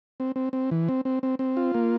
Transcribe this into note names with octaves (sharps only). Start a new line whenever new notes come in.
C4
C4
C4
E3
C4
C4
C4
C4
F4
A#3